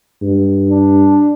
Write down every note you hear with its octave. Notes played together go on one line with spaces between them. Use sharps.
G2
D4